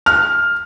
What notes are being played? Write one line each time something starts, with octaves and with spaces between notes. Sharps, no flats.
F6